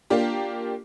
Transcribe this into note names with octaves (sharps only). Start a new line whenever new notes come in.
A#3 D4 F4 G4